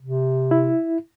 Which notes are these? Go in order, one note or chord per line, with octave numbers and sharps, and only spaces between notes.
C3
E4